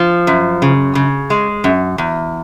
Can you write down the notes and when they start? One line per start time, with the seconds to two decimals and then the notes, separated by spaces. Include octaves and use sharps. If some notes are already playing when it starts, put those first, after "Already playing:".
Already playing: F3
0.27 F#2
0.62 C#3
0.95 C#3
1.30 G#3
1.64 F#2
1.98 E2